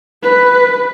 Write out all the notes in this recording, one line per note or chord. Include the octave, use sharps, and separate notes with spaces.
B4